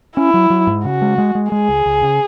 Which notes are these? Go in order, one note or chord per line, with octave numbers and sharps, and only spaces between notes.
C#4 E4
F#3
F#3
G#2
C#3 F#4
G#3
G#3
G#3
G#3 G#4
C#2
C#2
C#3